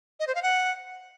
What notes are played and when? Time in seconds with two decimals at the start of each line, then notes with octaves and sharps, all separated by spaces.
0.20 D#5
0.27 C5
0.35 F5
0.43 F#5